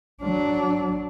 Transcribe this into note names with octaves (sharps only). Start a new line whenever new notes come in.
F#3 D4